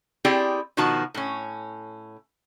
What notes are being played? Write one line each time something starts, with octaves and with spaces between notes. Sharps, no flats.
C4 E4 G4 G#4 D5
B2 D#3 F3 F#4 A5
A2 C#4